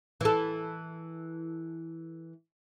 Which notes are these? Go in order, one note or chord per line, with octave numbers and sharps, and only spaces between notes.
E3 A4